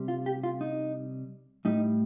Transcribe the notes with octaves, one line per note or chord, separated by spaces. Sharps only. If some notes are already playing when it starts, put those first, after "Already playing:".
Already playing: C3 G3
F4
G4
F4
D#4
A2 G3 D#4